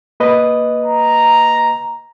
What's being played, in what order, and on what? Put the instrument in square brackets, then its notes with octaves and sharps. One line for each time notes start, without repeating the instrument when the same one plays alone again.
[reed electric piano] A#3 B4 D#5
[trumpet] A#5